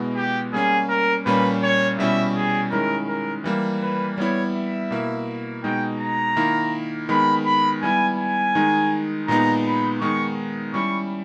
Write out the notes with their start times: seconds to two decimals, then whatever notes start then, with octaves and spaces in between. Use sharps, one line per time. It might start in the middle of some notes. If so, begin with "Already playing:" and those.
Already playing: B2 G#3 B3 E4
0.16 G4
0.53 G3 A#3 C#4 G#4
0.90 A#4
1.25 A#2 G3 A#3 C#4 B4
1.63 C#5
1.98 B2 G3 C#4 E4 E5
2.36 G#4
2.71 D#3 G#3 C#4 E4 A#4
3.08 A#4
3.44 E3 G3 A#3
3.82 B4
4.17 G3 B3 E4 C#5
4.54 E5
4.91 B2 A#3 E4
5.64 B2 G#3 D#4 G5
6.00 A#5
6.36 D#3 A#3 E4
7.09 D#3 G#3 B3 B5
7.45 B5
7.82 G3 B3 E4 G#5
8.18 G#5
8.55 D#3 G#3 D#4
9.27 A#2 G#3 B3 D#4 A#5
9.65 B5
10.01 D#3 G#3 B3 D#4 C#6
10.74 G3 C#4 E4 C#6